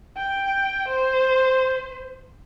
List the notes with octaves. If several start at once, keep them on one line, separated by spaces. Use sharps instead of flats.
G5
C5